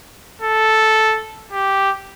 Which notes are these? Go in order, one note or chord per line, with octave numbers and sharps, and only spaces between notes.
A4
G4